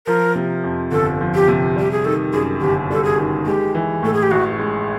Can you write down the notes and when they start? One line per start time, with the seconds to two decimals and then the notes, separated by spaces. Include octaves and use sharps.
0.06 F3 A#4
0.35 C3
0.64 F2
0.91 G1 A4
1.21 F3
1.35 G4
1.48 C3
1.76 G3 G4
1.91 G#4
2.05 D#3 A4
2.33 F#2 G#4
2.61 G1 G4
2.90 G3 A4
3.04 G#4
3.18 D#3
3.46 G#3 G4
3.75 E3
4.03 A2 A4
4.14 G#4
4.23 G4
4.31 A1 F#4
4.59 G#3